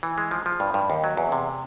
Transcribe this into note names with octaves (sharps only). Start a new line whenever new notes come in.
E3
G#3
F3
F3
G2
G2
D#2
F#3
E2
C3